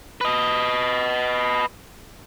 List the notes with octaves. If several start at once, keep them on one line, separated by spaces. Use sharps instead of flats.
B4 D#5